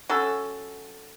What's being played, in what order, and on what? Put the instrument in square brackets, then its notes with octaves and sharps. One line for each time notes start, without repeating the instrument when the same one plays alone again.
[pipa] F#3 C#4 A4